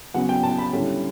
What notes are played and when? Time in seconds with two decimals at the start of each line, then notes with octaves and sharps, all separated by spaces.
0.14 C#3 F#3 B3 F#5
0.29 G5
0.43 A5
0.58 B5
0.73 D3 G3 C#4 E4